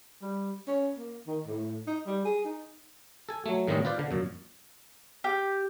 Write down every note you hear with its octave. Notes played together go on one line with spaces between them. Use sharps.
G3
C#4
A#3
D#3
A2
D#4
G3
G#4
D#4
A4 G#5
F#3 A3
A2 D#3 G3 C4 C#4 D#5
F4 B4 C5 D5
D3
F#2 A#2
G4